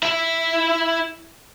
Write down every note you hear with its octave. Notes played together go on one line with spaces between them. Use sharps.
E4 E5